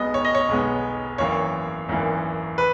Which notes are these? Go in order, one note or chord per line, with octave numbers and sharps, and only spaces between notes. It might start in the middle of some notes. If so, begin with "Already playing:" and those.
Already playing: B1 B2 G#3 B3 D#5
C#5
D#5
C#5
B1 B2 G#3 B3
G#1 F#2 E3 A#3 C#5
G#1 F#2 E3 A#3
B4